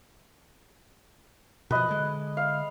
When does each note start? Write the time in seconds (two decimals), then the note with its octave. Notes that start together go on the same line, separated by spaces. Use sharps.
1.71 B2 F3 B4 D#5
1.89 D3 G#3
2.37 F5